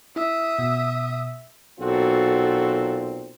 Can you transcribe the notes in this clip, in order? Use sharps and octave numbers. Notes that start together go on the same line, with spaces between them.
E4 E5 D#6
B2
B1 A#2 C4 F#4 A4